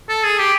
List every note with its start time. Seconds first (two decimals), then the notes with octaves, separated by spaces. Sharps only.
0.09 A4
0.24 G#4
0.39 G4